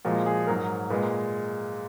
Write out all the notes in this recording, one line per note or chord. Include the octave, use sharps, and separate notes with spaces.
A#2 F3 G#3 F#4
G#4
G#2 F#3 A#4
A#2 G#3 B4